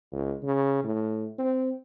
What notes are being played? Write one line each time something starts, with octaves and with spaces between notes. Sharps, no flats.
C#2
C#3
A2
C4